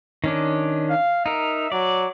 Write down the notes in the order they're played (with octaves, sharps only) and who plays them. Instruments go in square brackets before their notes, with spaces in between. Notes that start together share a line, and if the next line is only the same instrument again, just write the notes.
[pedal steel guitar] D#3 C#4 D4
[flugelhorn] F5
[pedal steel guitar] D#4 A#4 [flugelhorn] E5
[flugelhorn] F#3 [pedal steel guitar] D5